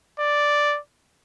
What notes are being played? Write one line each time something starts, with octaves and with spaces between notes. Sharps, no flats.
D5